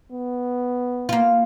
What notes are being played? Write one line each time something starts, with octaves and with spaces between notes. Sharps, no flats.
B3
A#3 F4